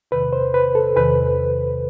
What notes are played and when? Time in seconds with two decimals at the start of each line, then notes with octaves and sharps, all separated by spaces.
0.11 E2 C3 D#3 B4
0.33 C5
0.54 B4
0.75 A4
0.96 E2 C3 D#3 B4